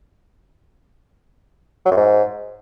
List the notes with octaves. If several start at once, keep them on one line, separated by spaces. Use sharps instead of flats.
F#3
F#2
G#2